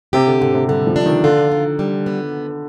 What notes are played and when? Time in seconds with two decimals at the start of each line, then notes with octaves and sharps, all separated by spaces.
0.13 C3 G4
0.27 D3
0.41 G#2 D3
0.55 C3
0.68 D3 G3
0.87 F3
0.96 D4
1.06 D#3
1.24 D3 F4
1.52 D#3
1.79 G3
2.06 B3